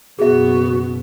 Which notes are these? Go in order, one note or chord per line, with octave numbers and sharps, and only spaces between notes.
F#1 B2 B3 F#4 G#4 E5